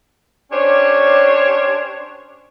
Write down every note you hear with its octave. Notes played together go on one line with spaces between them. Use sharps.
C#4 D4 G4 C5 C#5